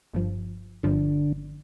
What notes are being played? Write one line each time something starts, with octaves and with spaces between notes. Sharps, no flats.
G1 G2 F3
G1 G2 D3 F3